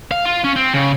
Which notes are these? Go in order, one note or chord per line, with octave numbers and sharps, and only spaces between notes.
F5
F4
C#4
C4
C#3